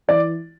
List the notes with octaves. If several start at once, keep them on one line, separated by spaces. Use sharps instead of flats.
E3 D5